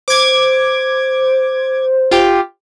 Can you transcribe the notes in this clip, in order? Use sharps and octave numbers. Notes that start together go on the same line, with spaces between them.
C5 D6 G#6
F4 G4